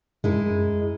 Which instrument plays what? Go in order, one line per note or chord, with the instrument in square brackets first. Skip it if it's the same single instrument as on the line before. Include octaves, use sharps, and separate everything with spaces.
[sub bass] F#2 [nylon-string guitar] G#3 E4 A#4